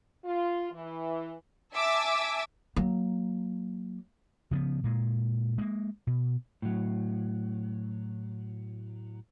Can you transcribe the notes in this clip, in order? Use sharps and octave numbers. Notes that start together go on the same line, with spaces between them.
F4
E3
E5 G#5 A5 D6 E6
F#3 A#3
C#3 F3 A3 B3
A#2 G#3
G#3 A#3
B2
A2 F#3